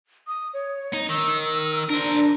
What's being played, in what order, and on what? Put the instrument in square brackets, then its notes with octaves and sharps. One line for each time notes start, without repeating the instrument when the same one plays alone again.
[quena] D#6
C#5
[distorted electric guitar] D#4
[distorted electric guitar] D#3 [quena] E6
[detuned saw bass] D4 [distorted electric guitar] A#4 C5